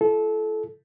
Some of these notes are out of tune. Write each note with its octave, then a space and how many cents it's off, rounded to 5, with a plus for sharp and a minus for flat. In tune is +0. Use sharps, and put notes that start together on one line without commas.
E4 +45 A4 -25